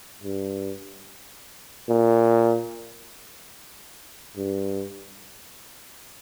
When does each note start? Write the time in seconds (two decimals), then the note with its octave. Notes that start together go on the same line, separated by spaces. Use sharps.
0.24 G2
1.89 A#2
4.37 G2